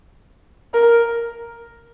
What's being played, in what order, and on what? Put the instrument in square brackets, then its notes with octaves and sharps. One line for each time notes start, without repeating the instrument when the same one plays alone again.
[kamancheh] A#4